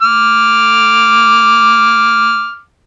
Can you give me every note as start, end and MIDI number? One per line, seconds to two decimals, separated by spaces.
0.02 2.60 86
0.02 2.60 89